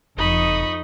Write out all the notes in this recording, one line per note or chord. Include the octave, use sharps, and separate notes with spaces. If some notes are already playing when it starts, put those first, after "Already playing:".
F#1 F2 D#4 D#5 B5 C#6 D#6